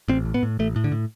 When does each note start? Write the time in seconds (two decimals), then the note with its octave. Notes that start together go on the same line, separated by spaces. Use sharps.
0.08 A1 C4
0.25 A2
0.34 B3
0.43 A2
0.59 A1 A3
0.76 A2
0.84 D3
0.92 A2